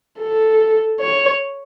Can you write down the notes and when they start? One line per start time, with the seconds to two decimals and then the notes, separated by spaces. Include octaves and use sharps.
0.20 A4
1.00 C#5